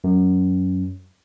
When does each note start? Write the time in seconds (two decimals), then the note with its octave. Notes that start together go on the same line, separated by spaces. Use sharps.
0.04 F#2